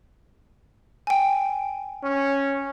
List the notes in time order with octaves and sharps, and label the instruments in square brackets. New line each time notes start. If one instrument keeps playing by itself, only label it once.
[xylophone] G5 G#5
[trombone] C#4